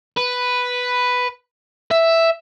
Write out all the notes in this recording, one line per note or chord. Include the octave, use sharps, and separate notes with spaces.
B4
E5